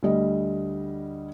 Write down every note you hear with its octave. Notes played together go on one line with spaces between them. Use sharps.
D2 G3 D#5